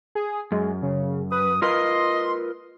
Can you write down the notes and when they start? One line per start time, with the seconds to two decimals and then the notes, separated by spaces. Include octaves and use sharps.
0.15 G#4
0.52 F#2 G#3
0.83 C#3
1.32 B4 D#6
1.62 F4 A#4 B4 D#5 C6